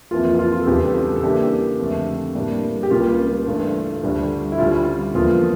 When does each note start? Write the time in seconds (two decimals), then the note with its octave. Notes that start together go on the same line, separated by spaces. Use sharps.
0.11 F2 E3 A#3 F4
0.25 F4
0.39 F4
0.52 F4
0.61 A4
0.67 E2 C#3 G3 D4 G4
0.95 A4
1.16 A4
1.23 C#3 E3 A#3 D4 G4
1.79 F2 D3 A3
2.35 A2 G3 A#3 D4
2.83 G4
2.90 C#2 C#3 G3 A#3 F4
3.46 G2 E3 A3 D4
4.03 D2 D3 G3 D4
4.52 E4
4.58 D2 D3 G3 C#4 F4
5.15 E2 D3 F3 A#3 F4